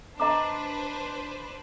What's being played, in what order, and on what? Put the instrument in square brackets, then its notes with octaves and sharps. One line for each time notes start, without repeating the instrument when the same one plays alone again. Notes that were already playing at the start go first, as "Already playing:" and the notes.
[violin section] D4 B4 C5 [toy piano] D#5 A#5 D6